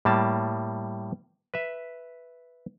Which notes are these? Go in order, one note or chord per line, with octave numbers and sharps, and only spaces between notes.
A2 G3 A#3 A5
B4 E5